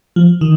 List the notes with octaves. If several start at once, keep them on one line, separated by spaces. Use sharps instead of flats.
F3
D#3